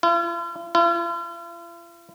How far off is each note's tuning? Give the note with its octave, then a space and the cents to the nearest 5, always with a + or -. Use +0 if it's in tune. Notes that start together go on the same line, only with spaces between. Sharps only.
F4 -45
F4 -45